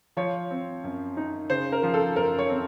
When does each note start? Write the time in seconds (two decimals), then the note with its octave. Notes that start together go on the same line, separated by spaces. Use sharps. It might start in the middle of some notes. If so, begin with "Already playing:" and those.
0.17 F3 C#5
0.50 C4
0.84 F#2
1.17 D#4
1.50 C#3 C5
1.72 A#4
1.83 F3
1.94 A4
2.16 F#2 A#4
2.39 C#5
2.50 C4